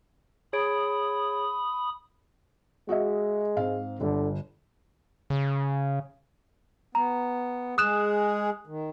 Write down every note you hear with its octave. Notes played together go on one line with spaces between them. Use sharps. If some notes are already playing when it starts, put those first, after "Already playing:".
G#4 C#5 B5 D#6 D7
G#3 F#4 D#5 E5
G#2 C4 F5
G1 D3
C#3
B3 A#5
G#3 G#4 D#6 F#6 E7
D#3